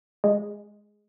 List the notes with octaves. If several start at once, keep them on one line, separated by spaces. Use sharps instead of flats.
G#3